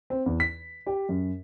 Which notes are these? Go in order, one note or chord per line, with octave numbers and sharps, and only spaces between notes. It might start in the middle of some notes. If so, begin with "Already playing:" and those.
C4
E2
B6
G4
F#2